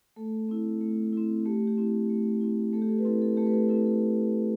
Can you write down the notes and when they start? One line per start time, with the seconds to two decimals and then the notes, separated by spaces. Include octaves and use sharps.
0.16 A3 A4
0.49 C4 E4
0.81 A3
1.13 C4 E4
1.45 A3 G4
1.67 G4
1.78 C4 E4
2.10 A3
2.41 C4 E4
2.73 A3 A4
2.82 G4
2.89 A4
2.98 B4
3.05 C4 E4 A4
3.22 A4
3.37 A3 G4
3.47 B4
3.54 A4
3.69 C4 E4 A4
3.86 A4